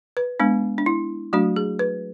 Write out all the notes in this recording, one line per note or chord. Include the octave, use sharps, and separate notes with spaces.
B4
G#3 B3 D4
D4
E4
F#3 A3 D4 F#4
G#4
B4